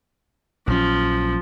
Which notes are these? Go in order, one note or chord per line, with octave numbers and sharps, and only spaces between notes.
A#1 F3 F#3 C#4